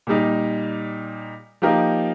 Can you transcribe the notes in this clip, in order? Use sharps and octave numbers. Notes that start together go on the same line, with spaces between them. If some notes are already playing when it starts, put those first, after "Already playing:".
A#2 G3 D#4
F3 A#3 D#4 G4 A#4